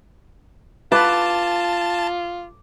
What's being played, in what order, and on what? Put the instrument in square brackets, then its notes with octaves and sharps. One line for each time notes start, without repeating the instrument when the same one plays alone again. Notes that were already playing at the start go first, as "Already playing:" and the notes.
[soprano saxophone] F4 [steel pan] B4 [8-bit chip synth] A5 [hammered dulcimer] D6